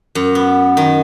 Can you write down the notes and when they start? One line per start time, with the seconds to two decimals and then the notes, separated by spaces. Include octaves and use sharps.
0.15 F#2
0.35 B3
0.77 D#3